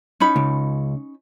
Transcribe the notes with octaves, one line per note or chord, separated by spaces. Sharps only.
C#4 D#4 B5
C#2